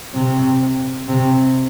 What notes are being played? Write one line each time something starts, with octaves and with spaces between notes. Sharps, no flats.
C3
C3